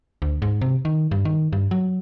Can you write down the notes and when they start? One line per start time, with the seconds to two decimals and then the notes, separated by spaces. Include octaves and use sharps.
0.22 D2
0.42 G#2
0.61 C3
0.85 D#3
1.11 G2
1.25 D#3
1.53 G2
1.71 F#3